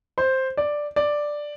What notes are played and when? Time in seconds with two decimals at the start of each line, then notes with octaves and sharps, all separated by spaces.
0.18 C5
0.57 D5
0.96 D5